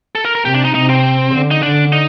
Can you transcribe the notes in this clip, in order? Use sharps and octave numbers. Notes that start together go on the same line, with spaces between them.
A4
A#4
A#4
C3 G4
D4
D#4
C3 D#4
C4
D3
D#4
D3 D4
D#4